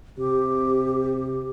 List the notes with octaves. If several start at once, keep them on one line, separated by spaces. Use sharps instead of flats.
C3 G4